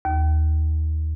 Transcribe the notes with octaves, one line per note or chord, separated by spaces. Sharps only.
D#2